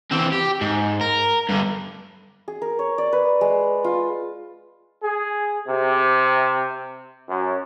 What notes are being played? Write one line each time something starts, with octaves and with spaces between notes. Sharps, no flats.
E3 C4
G4
G#2
A#4
G2 D3
G#4
A#4
C#5
D5
B4
G#3
F4
G#4
C3
F#2